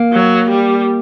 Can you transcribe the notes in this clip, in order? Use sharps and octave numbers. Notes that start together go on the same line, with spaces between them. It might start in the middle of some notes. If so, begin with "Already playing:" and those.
Already playing: A#3
F#3
G3